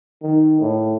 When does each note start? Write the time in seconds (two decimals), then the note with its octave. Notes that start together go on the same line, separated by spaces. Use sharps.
0.22 D#3
0.60 A2